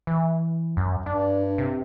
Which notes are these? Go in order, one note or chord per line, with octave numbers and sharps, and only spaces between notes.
E3
F#2
G2 D4
C3